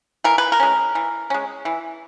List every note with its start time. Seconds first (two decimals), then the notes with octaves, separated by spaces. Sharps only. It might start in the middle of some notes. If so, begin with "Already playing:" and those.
0.24 E3 A#4
0.38 B4
0.52 A#4
0.60 G#3 C#4
0.95 E3
1.30 G#3 C#4
1.65 E3